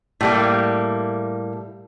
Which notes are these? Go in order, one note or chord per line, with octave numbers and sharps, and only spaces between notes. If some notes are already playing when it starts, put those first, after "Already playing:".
A2 G3 A#3